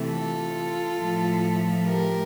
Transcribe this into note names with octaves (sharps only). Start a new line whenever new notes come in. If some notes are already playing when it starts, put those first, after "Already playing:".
Already playing: C3 E3 A3
F4 A4
A2 F3 A3
G4 A#4